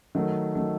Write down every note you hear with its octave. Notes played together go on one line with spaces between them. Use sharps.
D#3 F#3 A3
D#3 F#3 A3